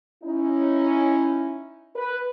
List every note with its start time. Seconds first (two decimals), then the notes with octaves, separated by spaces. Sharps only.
0.22 C#4 D#4 E4
1.95 B4